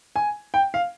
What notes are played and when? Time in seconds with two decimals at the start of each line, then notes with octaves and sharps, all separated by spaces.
0.16 G#5
0.54 G5
0.74 F5